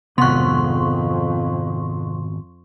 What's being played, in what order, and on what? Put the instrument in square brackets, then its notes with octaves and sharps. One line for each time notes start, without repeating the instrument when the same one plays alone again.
[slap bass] G#1 B3 [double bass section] F2 [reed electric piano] C3 F#5 F#6 [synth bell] C6 C#6